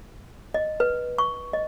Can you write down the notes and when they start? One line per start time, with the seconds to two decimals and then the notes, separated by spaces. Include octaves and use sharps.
0.54 D#5
0.80 B4
1.18 C#6
1.53 D#5